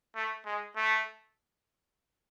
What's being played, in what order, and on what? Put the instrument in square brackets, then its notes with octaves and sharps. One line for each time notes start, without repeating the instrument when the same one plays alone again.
[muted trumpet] A3
G#3
A3